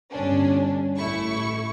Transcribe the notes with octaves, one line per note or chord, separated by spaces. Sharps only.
G1 C#4 D4
A1 A3 E4 C#6